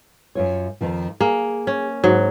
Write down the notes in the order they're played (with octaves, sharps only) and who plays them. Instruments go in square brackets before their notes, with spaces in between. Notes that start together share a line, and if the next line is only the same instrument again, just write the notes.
[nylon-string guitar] F#2 F4 C#5
F2 D#3 F3
[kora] A#3 [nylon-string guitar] G#4
[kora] C#4
G#2 F#3